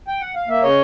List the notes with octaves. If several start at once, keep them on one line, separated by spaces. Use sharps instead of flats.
G5
F#5
F5
A#3 E5
C#3 C#5 D#5